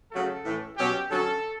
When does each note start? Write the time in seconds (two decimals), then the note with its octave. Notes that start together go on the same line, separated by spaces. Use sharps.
0.11 C#3 F#3 A3 A4
0.45 A2 E3 A3 C#4
0.77 B2 F#3 C#4 G4
1.10 D3 F#3 C#4 A4